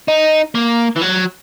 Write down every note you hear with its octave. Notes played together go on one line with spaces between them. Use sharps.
D#4
A#3
E3
F#3